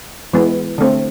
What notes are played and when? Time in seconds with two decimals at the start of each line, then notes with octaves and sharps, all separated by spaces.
0.33 E3 G#3 B3
0.78 D3 A3 C4